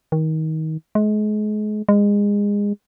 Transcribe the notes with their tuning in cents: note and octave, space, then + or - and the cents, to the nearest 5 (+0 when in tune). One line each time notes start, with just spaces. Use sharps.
D#3 +25
G#3 +35
G#3 -25